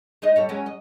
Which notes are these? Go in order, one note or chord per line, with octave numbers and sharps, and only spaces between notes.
G#3 D#4 D#5
G3 A4 C#5
F#3 G#3 C#4
D#5